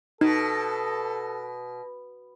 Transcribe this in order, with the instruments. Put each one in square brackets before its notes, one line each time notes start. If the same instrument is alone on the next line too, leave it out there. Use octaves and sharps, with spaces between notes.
[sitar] B2 [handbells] D#4 [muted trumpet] A4